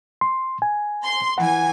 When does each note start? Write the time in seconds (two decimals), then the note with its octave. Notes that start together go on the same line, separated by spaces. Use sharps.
0.21 C6
0.62 G#5
1.03 C6
1.38 E3 F#5 G#5